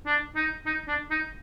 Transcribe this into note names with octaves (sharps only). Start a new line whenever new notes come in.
D4
D#4
D#4
D4
D#4